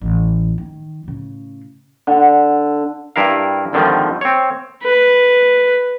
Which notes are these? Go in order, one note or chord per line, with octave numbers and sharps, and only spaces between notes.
A1 A2
D#3
A2 C#3
D3
G2 E4 A#4 F5
G#1 D3 D#3 F3 G3
C4 C#5
B4